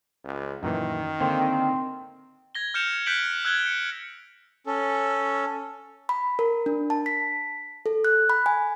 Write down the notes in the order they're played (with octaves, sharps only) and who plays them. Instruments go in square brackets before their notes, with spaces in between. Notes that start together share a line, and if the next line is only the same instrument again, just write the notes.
[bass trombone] C#2
[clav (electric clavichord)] F#2 A#2 E3 [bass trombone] D#3
[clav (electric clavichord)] D3 A#3 C5 [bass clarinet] C4
[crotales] G#6 A#6 G7
F6 G6 C#7 E7 F7
F#6 G6 B6 D7 F#7
E6 F#6 G#6 F#7 G7
C#7
[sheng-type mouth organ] C#4 A4
[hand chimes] B5
A#4
D4
A5
B6
A4
F#6
B5
G#5